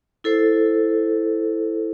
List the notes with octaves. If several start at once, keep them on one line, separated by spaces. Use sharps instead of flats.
E4 A4 C5